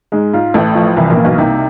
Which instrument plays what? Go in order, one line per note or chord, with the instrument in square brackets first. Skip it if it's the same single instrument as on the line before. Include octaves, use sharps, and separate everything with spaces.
[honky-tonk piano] G#2 [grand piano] G#3
[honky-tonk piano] G#2 [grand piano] F4
[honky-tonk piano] A1 A2 [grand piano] A3
[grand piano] F3
[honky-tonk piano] C2 C3 [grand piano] E3
[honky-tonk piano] A#1 A#2
[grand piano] A#3
[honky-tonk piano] B1 B2
[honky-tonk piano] C2 C3 [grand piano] D#4